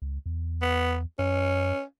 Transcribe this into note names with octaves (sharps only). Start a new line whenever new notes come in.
C#2
E2
B3
F#2 C#4